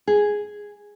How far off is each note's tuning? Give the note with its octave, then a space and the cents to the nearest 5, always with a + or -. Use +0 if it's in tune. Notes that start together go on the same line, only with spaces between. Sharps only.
G#4 +0